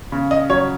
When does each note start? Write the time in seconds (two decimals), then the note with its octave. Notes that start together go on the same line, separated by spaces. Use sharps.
0.12 C#3
0.31 D#5
0.49 F#3 C#5